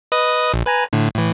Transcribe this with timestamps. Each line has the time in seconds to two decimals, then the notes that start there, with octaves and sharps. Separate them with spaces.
0.12 B4 D#5 D#6
0.54 A#1
0.66 B4 G#5 A#5
0.93 A2 D3
1.15 A2 E3